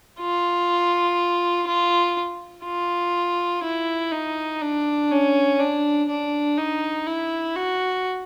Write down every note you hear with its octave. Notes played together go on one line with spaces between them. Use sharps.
F4
F4
F4
E4
D#4
D4
C#4
D4
D4
D#4
E4
F#4